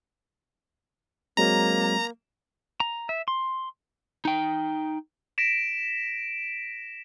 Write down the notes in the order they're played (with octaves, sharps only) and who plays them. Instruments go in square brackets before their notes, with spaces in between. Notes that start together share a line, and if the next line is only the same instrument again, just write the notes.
[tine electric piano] F#3 G#3 C4 [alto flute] A#3 [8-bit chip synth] A#5
[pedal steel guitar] A#5
E5
C6
[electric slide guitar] D#4 G5
[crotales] A#6 B6 D7 E7